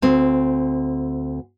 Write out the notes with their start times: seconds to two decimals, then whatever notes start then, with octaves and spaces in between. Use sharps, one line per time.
0.02 D2 C4